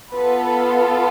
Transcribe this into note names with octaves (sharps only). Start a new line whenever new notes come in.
B3 F4 A4 B4